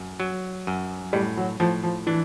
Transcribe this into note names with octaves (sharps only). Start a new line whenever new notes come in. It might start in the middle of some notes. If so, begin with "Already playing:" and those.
Already playing: F#2
F#3
F#2
A2 G3
F#3
A2 F3
F3
E3 D4